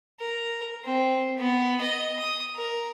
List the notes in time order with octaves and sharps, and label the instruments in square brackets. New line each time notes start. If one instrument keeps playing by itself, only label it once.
[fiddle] A#4
C4
B3
D#5
D#6
A#4